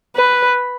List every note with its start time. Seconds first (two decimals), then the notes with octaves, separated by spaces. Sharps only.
0.16 B4